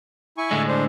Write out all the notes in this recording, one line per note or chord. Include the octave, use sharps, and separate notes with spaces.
E4 G#5 C#6
A2 D3 G#3
D4 C5